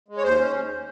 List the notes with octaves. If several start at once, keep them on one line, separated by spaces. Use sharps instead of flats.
G#3
C#5
D#2 C5
C#4